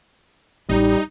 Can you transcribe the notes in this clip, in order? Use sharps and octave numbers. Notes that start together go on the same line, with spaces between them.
A1 G3 D#4